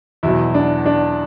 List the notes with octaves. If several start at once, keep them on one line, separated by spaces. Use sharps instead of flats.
E2 B2 F#3 E4
D4
D4